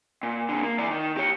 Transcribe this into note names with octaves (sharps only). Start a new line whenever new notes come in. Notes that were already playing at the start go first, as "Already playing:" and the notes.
A#2
A#2 D3
A#3
E3 D5
D#3
G4 C#5